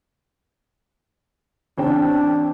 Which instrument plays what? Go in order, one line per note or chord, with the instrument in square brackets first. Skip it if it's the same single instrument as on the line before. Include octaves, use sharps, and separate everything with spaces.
[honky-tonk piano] A1 C4 G5 [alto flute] D4